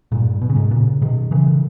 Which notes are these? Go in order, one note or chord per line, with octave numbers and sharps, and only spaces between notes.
G2 A#2
B2
C#3
G#2 B2
A#2 C#3
B2 D#3
C#3 E3